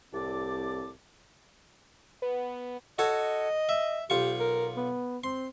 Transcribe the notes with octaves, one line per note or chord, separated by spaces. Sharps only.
C2 A2 C4 D5 A5 D6
B3
F#4 A4 C#5 D#5
E5
B1 F4 G4 C#6
A#4
B3
C4 C6